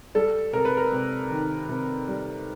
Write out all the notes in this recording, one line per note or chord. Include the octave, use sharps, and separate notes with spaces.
G3 A4
C3 A#4
B4
A#4
C3
D#3
C3
G3